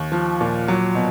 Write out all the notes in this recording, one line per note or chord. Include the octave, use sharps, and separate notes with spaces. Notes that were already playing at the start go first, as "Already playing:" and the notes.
Already playing: D#2
F3
A#2
F#3
B2